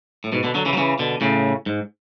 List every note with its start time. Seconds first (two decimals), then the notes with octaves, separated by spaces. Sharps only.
0.24 A2
0.32 G#2 B2
0.44 B2 D3
0.55 D3 F#3
0.66 C#3 E3
0.73 F#3
0.77 C#3 E3
0.99 B2 D3
1.21 A2 C#3
1.66 G#2